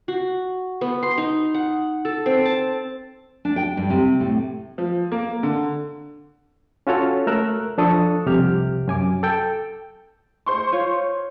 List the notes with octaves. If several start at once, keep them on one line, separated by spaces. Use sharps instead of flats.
F#4
B3
C6
D#4
F#5
A4
C4
A5
D4
G5
G2
C3
A2
F3
A#3
D3
C#4 F4 F#4 A4 C#5
A3 A#4 E6 F#6
F3 D4 A4 C#6 D#6
C2 F2 C3 G4 F6
F#2 G#5 D6
A4 G5
C5 C6 C#6
F4 C#5